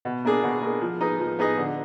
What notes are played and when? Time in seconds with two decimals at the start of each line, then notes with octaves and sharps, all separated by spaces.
0.05 B2
0.25 A#3 D4 G#4
0.43 B2
0.62 A#3 D4 G#4
0.81 F3
1.01 B3 D#4 G#4 D#5
1.19 F3
1.39 B3 D#4 G#4 D#5
1.58 D3